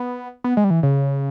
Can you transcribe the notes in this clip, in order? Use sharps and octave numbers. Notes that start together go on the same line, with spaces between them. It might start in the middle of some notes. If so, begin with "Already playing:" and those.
Already playing: B3
B3
G#3
G3
E3
C#3